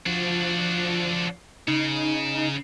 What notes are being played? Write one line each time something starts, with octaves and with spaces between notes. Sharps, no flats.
F3 D4 F#4
C#3 D#4